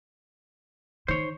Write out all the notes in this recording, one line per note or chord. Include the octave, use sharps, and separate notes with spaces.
D#3 C5 C#5